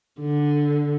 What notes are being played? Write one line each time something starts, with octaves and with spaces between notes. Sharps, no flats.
D3